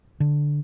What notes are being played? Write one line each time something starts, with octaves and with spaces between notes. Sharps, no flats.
D3